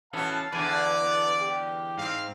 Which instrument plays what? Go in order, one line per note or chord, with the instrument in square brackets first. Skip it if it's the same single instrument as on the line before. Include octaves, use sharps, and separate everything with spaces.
[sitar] E3 F#4 [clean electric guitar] B3 C#4 A4 [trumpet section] F5 A5
[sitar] E2 D3 [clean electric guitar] B4 G#5 [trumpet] D5
[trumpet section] B3 A4
G4
[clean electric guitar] G#2 C4 [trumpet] F5